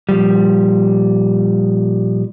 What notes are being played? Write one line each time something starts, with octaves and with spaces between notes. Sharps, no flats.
A#2 F3 G3